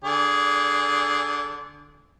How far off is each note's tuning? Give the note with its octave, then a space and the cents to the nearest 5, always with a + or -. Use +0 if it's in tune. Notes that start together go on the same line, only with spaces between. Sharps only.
D3 +0 G#4 +0 D5 -35